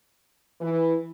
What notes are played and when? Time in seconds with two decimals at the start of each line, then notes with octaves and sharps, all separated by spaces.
0.61 E3